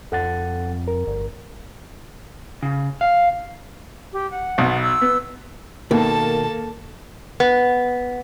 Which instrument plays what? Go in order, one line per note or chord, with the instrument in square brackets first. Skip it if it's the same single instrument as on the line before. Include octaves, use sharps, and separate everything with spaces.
[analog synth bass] F2 [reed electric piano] A4 F#5 A6
[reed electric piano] A#4
[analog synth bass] G1
[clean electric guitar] C#3
F5
[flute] G4
F#5
[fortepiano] B1 B2
[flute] E6
[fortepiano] B3
[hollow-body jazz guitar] B2 D#3 [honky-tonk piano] A#3 [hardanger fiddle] A4 A5
[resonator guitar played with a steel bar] B3